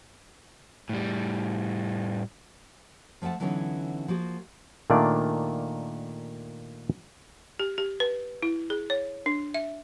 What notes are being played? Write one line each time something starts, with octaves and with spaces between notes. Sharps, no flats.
A2 G3
F3 A3 D#5 F#5 A5
D3 E3 F#3 B3 C#4 D#4
F3 A#3 F#4 G#4
A#2 D#3 A3 A#3 D4 D5
G4
G4
B4
E4
G#4
C#5
D4
E5